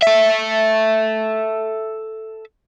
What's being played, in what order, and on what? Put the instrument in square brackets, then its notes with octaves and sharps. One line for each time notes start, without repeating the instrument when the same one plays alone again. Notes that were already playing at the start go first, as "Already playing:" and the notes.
[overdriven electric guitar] A4 E5